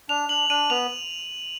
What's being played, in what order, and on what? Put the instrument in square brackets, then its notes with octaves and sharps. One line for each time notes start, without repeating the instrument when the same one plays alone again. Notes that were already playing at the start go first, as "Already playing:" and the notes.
[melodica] D4 [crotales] F7
[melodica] D4 [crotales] F#7
[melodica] D4 [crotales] D#7
[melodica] B3 [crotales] F7